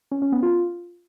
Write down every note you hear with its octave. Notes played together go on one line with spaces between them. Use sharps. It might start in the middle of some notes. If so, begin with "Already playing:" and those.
C#4
C#4
B3
F4